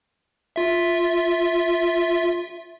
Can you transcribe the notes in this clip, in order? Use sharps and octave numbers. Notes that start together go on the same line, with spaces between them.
F4 E5